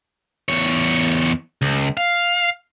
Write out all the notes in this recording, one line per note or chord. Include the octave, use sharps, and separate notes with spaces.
E2 C#5
C#2
F5